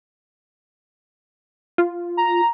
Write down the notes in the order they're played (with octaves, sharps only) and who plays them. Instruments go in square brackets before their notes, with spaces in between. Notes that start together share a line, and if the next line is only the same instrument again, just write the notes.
[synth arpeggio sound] F4
[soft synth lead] A#5